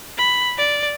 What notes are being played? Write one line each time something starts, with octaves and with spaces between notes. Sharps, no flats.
B5
D5